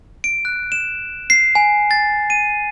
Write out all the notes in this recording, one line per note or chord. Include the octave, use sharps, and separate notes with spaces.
D7
F#6
E7
C7
G#5
A6
D#7